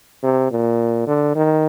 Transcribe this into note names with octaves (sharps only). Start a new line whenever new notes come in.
C3
A#2
D3
D#3